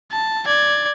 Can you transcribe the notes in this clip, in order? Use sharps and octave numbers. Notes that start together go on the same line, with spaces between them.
A5
D5 G#6